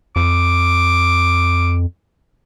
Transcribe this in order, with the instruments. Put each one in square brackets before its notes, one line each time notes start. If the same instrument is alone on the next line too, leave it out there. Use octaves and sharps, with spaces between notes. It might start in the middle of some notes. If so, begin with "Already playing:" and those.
[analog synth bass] F2 [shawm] D6